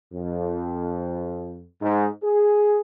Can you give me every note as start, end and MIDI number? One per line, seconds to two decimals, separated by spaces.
0.13 1.62 41
1.81 2.07 44
2.23 2.79 68